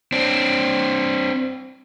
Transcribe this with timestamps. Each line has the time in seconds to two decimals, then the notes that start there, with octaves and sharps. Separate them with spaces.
0.12 C4 D4